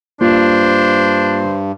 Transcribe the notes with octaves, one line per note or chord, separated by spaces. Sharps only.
G2 A#3 D4 F4 C5